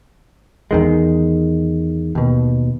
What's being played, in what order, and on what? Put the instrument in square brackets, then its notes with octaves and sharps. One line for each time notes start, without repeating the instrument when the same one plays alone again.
[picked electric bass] E2 D#3 G#3
D#2 B2